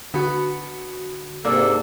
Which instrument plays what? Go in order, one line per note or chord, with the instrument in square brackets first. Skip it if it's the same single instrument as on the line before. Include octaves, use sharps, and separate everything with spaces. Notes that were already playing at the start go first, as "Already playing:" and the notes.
[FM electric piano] D3 F#4 [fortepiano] B3
[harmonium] G#2 C3 A4 [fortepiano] A#3 D4